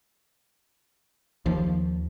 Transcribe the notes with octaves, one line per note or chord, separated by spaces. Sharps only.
D#2 F3